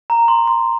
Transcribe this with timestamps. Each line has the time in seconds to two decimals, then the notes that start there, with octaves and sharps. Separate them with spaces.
0.10 A#5
0.28 C6
0.47 C6